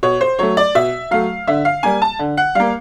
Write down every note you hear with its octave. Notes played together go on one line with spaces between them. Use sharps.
B2 C#5
C5
F#3 A3 C#5
D5
B2 E5
F#3 A3 F5
D3 E5
F5
G3 A#3 G#5
A5
D3
F#5
G3 A#3 F5